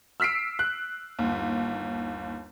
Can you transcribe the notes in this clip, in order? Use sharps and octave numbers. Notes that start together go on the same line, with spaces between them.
E6 F6 B6 C7 D7
F#6
G1 D#2